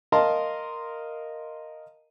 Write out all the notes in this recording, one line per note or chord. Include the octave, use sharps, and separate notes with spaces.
A#4 D#5 F5 A5 A#5 C6